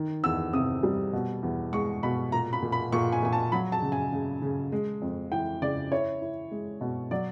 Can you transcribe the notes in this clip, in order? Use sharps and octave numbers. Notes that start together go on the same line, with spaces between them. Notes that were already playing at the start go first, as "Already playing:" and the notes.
Already playing: D#3
E2 E6
C3 D#6
G3
B2
E2
G#3 C#6
B2 B5
A#2 A#5
B5
A#2
B5
A#2 C#6
G#5
A#2 G#5
A5
F#3 B5
A5
C#3
G#5
C#3
C#3
G#3
F2
E3 G5
C#3 D5
E4 C#5
E4
G#3
B2
F#3 D5